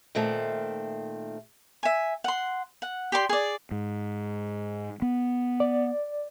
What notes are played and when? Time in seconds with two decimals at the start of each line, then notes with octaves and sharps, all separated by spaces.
0.15 A#2 D#3 A3 C4
1.83 E5 G#5
2.24 F#5 C6
2.82 F#5
3.12 G4 D5 C6
3.29 G#4 D5
3.71 G#2
5.02 B3
5.60 D5